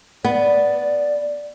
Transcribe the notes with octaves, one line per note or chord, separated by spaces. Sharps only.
B3 D5